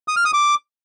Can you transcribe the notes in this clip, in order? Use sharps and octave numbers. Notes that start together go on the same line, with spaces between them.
D#6
F6
D#6
D6